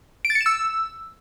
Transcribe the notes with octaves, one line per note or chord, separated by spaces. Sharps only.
D7
A6
C#7
E7
E6